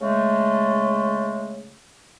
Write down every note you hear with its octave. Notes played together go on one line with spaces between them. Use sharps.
C#3 G#3 A3